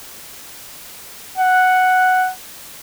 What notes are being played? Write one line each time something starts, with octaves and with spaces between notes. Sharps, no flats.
F#5